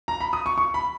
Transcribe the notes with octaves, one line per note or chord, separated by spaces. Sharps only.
A#5
B5
D#6
C#6
C#6
B5